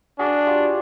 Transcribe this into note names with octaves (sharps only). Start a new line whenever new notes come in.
D4 F#4 G#4
F4 G4